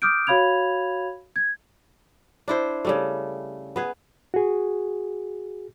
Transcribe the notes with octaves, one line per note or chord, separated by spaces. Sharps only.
D6 D#6 F6 G6 D7
F#4 C#5 F5 B5 G#6 F7
G#6
D4 E4 C5
C#3 G3 A3
B3 G#4
F#4 G#4